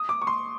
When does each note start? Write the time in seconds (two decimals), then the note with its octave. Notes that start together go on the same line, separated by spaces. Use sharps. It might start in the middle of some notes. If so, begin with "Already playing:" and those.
Already playing: D#6
0.09 D6
0.22 C#6
0.27 C6